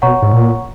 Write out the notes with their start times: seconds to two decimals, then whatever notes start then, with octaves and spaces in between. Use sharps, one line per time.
0.02 B2 C#5 F#5 A#5 C#6
0.23 G#2
0.33 A#2